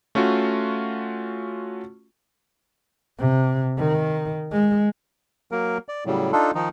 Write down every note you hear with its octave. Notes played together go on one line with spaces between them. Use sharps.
A3 C#4 F4 F#4
C3
D#3
G#3
F#3 A#3 A#4
D5
A2 C#3 F#3 G3
D4 D#4 F4 A4
D#3 F3 D#4